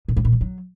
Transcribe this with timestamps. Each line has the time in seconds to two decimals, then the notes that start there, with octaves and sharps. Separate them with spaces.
0.08 A#2
0.17 G#2
0.25 A#2
0.33 F3
0.41 F#3